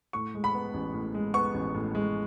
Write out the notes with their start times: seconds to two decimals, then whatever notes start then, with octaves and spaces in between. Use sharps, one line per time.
0.13 A2 C#6
0.34 G#3
0.44 B5
0.54 B3
0.74 A1
0.94 A2
1.14 G#3
1.34 B3 C#6
1.54 A1
1.75 A2
1.95 G#3